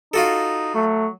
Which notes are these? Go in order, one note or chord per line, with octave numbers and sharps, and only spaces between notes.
D#4 F4 F#4 A4
F#3 A3